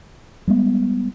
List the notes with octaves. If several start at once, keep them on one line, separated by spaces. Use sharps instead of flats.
G3 G#3 B3